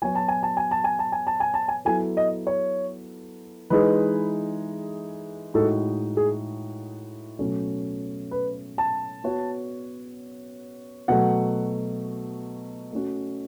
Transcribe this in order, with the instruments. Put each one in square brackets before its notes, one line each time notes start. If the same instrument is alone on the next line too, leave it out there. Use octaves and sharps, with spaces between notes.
[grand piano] F#3 B3 F#4 C#5 [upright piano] G#5
[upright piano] A5
G#5
A5
G#5
A5
G#5
A5
G#5
A5
G#5
A5
G#5
[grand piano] F#3 B3 E4 A4 [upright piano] G#5
[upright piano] D#5
C#5
[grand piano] E3 G#3 D#4 G#4 [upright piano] B4
[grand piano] A2 G#3 D#4 F#4 [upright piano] A4
[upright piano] G#4
[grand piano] B2 F#3 A3 C#4
[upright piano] B4
A5
[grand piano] B3 F#4 C#5
[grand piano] B2 F#3 A3 [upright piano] F#5
[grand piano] A3 C#4 F#4